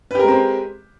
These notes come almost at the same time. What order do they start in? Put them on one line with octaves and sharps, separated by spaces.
B4 G4 A#4 G#3 C4